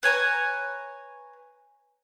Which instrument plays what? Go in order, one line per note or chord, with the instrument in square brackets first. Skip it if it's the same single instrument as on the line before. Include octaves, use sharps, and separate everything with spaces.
[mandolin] B4 C#5 G#5 A#5